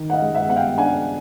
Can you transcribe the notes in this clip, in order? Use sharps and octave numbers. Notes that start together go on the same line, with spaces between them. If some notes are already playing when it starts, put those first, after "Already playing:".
Already playing: D#3
F#5
D#5 F5
G#3
E5 F#5
B3 F#5
F5 G5
D4 F#5 G#5